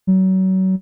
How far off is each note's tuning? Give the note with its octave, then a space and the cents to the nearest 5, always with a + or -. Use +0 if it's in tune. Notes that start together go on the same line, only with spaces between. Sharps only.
F#3 +30